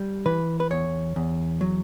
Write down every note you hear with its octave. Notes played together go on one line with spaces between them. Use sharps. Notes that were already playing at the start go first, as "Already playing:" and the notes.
Already playing: G3
E3 B4
B4
E2 C#5
E2
F#3